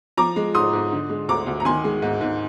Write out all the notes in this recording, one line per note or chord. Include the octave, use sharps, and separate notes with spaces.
F3 A#5 D6
G#3
G#2 C6 D#6
G#2
D3
G#3
D2 A#5 D6
D2
A#5
D#3 G#5 C6
G#3
G#2
G#2